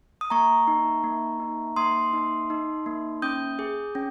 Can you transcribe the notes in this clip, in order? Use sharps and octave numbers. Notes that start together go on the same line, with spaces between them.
D#6
A#3 A#5 C#6
D#4
A#3
D#4
A#3 C6 D#6
D#4
D#4
A#3
C#4 D#6 G6
G#4
C#4